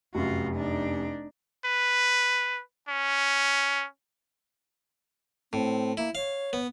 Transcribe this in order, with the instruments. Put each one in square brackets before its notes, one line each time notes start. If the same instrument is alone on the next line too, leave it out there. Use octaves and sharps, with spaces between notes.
[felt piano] F1 F#2 [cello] F4 F#4
[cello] D4 D#4
[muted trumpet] B4
C#4
[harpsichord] A2 [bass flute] C4
[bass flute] A#3 [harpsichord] E4
[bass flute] C#5 [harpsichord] F5
[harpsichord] B3